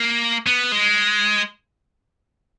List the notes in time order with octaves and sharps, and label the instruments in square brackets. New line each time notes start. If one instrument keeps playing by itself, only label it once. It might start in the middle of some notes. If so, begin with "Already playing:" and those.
Already playing: [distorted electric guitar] A#3
B3
G#3